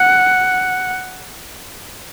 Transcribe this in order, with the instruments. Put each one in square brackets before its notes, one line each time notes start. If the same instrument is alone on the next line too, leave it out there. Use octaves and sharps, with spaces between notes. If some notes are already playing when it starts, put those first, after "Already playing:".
Already playing: [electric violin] F#5